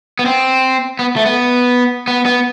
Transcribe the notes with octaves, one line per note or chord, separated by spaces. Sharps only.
B3
C4
B3
A3
B3
B3
B3